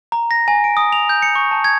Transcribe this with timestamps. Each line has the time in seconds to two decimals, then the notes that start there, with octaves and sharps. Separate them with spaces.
0.12 A#5
0.31 A#6
0.48 G#5
0.64 D7
0.77 D#6
0.92 F7
1.09 G6
1.22 C#7
1.36 C#6
1.51 A5
1.64 G#6